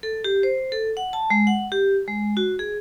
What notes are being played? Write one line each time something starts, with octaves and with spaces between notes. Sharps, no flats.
A4
G4
C5
A4
F#5
A5
G#3
F#5
G4
G#3
F#4
G#4